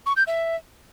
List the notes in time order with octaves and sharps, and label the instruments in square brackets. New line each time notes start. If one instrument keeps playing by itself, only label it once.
[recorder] C#6
G6
E5